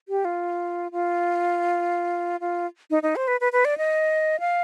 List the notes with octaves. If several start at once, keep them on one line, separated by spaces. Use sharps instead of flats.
G4
F4
F4
F4
D#4
D#4
C5
B4
B4
B4
D5
D#5
F5